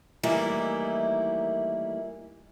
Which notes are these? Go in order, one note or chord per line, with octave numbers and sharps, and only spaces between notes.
D#3 E3 G3 A3 A#3 E4